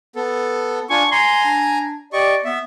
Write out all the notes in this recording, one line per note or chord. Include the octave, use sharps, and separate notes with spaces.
B3 A4
D4 F4 G#5 C#6
G#5 A#5 C6
D4
G4 D5 D#5 C#6
B3 E5